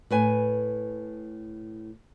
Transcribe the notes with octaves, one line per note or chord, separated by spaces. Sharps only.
A2 B4 G#5